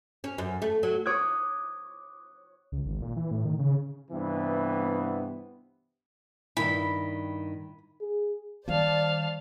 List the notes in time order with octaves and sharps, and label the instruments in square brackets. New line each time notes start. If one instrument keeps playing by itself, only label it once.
[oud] C#4
F#2
A3
F#3
[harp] C#5 D6 D#6 F#6 G#6
[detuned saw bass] C#2
G#1
A#2
E3
A2
D#3
C#3
[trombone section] G2 C3 E3 [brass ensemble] B3
[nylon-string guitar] G2 D#3 E4 [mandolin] B5
[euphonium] G#4
[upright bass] D#3 G3 [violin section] C5 D5 A5 [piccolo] F5